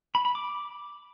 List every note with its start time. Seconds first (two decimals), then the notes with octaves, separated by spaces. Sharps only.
0.15 B5
0.25 B5
0.35 D6